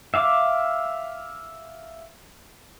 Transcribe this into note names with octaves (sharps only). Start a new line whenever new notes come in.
E5 F5 D6